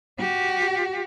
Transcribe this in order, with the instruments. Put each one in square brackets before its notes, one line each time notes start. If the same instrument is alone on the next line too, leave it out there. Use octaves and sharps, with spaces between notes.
[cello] F#4 G4